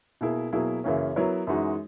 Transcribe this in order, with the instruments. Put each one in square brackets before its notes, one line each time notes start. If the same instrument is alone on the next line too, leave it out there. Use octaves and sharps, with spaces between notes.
[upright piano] B2 A#3 E4 G#4
B2 F#3 A#3 E4 G#4
F#2 C#3 E3 A#3 C#4
F#3 B3 E4 A#4 C#5
F#2 E3 G#3 D#4 F#4